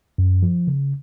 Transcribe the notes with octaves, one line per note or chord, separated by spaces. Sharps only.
F#2
F3
C#3